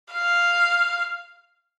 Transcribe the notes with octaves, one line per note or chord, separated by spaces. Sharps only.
F5